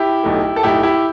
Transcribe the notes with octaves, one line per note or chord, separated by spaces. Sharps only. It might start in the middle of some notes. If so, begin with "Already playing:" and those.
Already playing: E4 G4
B1 B2 A3
A4
B1 B2 A3 E4 G4
E4 G4